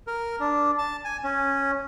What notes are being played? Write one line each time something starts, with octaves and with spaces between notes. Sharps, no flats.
A#4
D4
A5
G#5
C#4